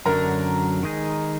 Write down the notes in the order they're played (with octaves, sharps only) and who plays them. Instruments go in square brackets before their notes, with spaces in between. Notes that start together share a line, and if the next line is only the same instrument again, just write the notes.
[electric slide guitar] F#2 D3 F#3 D4 [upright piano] A#4 A#5
[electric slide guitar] D#3 G#3 D#4 G#4